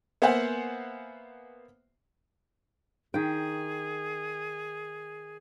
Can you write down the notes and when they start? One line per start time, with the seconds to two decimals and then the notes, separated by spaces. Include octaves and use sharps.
0.22 A#3 B3 C5 E5 F#5 G#5
3.14 D#3 G#4 G5